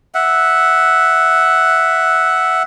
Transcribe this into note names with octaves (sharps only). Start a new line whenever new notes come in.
E5 F#5